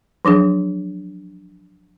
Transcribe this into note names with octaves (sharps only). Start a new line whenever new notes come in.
F3 F#3 D4 G#4